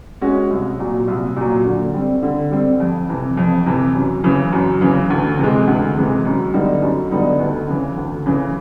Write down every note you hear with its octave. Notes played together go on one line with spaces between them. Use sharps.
G#3 C#4 F#4
C2
A#2 F#3
C2
A#2 F#3
D3
G3 C4
D3
G3 C4
F2
C3 E3
F2
C3 E3
F#2
C#3 E3
F#2
C#3 E3
D2
C3 E3 G#3
D2
C3 E3 G#3
F#2
D3 G3 B3 D#4
F#2
D3 G3 B3 D#4
D2
C#3 E3
D2
C#3 E3